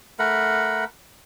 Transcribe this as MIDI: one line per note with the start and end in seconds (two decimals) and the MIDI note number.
0.19 0.84 57
0.19 0.84 70
0.19 0.84 78
0.19 0.84 83